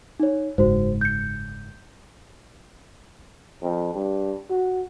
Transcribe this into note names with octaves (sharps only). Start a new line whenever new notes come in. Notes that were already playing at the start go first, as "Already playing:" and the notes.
D#4 C#5
F#1 G#2 F#4 C5
G6 C#7
F2
G2
F#4